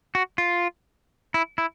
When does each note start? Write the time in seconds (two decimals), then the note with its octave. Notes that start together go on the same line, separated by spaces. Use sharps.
0.15 F#4
0.38 F4
1.34 E4
1.58 E4